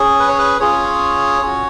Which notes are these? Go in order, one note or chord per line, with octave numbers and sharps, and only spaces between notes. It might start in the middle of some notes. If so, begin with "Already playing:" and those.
Already playing: C#4 G#4
B4
C#5
B4
C#4 F4 G#4 C#5
C#4 F#4